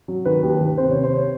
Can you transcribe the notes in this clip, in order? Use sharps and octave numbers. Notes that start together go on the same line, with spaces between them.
F#3
D#3 B4
D#2
D#3
C3 C5
C3 C#5
C5
C#5